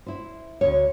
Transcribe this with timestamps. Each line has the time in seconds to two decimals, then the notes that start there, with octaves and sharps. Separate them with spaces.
0.06 E4 C5
0.61 D2 C#5